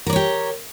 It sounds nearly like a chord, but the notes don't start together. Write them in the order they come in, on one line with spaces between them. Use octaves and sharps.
A#4 D5 C#5 G4